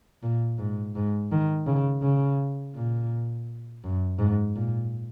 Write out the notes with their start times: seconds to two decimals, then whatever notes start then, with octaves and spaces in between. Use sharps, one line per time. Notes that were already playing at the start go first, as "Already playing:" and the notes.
0.23 A#2
0.58 G#2
0.95 G#2
1.32 D#3
1.67 C#3
2.02 C#3
2.75 A#2
3.84 F#2
4.19 G#2
4.56 A#2